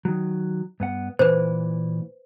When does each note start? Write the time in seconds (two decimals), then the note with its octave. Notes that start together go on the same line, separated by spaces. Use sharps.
0.05 D#3 F#3
0.80 G2 B3 F#5
1.19 A#2 E3 B4 C5